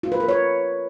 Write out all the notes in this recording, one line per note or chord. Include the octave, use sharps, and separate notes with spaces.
F4
B4
A#4
C#5